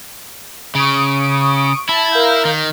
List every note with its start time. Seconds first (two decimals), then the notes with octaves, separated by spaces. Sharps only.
0.75 C#3 C#6 D#6 D7
1.89 E4 A5
2.11 A#4 F5 G6
2.45 D#3